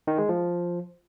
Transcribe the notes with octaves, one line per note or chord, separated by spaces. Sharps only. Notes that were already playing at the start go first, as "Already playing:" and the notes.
D#3
G#3
F3